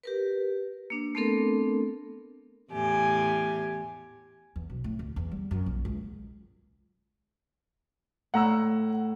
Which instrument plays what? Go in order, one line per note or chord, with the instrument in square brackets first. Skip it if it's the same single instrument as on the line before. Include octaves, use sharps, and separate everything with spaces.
[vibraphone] G4 A#4 B4
A#3 D4
A3 B3 C4 D4 A4 A#4
[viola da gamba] E2 A2 G4 [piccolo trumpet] G#5
[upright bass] E2
B1
A2
D2
E2
G3
F#2
A#1
C#2
[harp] A2 [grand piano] F#5 A#5 E6